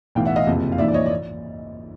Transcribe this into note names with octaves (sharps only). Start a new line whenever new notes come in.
B1 A2 E3 F5 G5
E5 F#5
D#5 F5
F#1 F2 C3
F5
A#1 G#2 E3 D5 E5
D5
C#5 D#5
D5